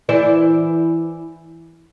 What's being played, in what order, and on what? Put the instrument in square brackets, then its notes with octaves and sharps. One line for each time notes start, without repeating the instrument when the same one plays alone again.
[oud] E3 C5 D5